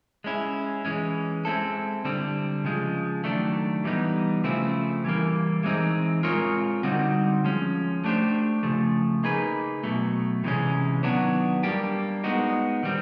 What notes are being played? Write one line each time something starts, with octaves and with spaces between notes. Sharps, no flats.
G#3 C#4 E4
E3 G#3 C#4
G#3 C4 E4 A4
D3 G3 C4
C#3 F3 G#3
D#3 F#3 A3 D4
E3 G3 B3 D#4
C#3 F3 A3 C4 E4
E3 G3 A#3
E3 G#3 C4 D#4
G#3 C4 F4 A#4 C#5
D3 G3 C4 D#4 F#4
F3 G#3 C#4
A3 D4 G4 C5
C#3 F3 A3
A#3 D#4 G#4 B4
B2 F#3 A3
C3 E3 G#3 C#4
D#3 F#3 B3 D4 F#4
G3 A#3 D4 G4
G#3 B3 D#4 F#4
D#3 G3 C4